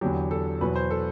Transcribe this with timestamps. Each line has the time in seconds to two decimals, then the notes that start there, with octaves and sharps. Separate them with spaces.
0.01 E2 D3 F#3 G4
0.31 A4
0.61 E2 B2 F#3 B4
0.75 C5
0.91 A4